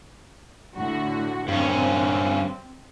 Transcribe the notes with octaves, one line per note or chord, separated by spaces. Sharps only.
A2 D3 F#4
G2 C4 C#4